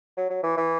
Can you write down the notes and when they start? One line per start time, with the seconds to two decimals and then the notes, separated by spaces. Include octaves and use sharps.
0.17 F#3
0.30 F#3
0.43 E3
0.57 E3